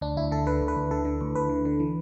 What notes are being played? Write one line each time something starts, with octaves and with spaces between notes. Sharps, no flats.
D2 D4
D2 E4
D3 A4
D3 B4
D2
B4
D2
D3 A4
D3
D2
D2 B4
D3
D3
E3